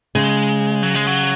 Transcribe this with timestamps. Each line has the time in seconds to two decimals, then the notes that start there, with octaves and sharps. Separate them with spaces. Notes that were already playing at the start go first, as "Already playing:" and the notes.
0.15 C#3 G#3
0.83 F#3
0.95 G#3
1.07 F#3